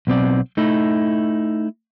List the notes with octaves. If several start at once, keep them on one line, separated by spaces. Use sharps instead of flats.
B1 B3 C4 D5
A3 D#4 E4